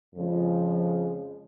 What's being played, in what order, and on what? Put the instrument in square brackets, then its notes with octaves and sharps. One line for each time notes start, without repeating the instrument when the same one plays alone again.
[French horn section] F2 C#3 F3 G#3